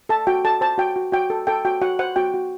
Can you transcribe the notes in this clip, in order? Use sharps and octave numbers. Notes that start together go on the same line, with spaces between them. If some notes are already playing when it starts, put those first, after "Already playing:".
A4 A5
F#4 G5
A4 A5
C5 A5
F#4 G5
F#4
F#4 G5
A4
A4 G5
F#4 G5
F#4 F#5
C5 F#5
F#4 G5
F#4